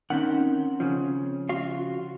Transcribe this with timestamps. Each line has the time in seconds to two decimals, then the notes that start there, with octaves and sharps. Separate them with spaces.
0.10 D#3 C4 C#4 F#5
0.80 C#3 F3
1.49 F4 F#4 F5